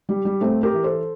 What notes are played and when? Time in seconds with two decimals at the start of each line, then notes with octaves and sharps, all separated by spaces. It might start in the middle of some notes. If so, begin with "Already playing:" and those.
0.09 G3
0.25 G3
0.41 A2 A3 C4
0.63 G4 A#4
0.74 E3
0.84 A4 C5